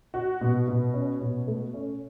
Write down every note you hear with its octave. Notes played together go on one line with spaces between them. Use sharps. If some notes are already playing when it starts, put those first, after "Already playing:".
F#4
B2
B2
C#4
B2
A3
C#4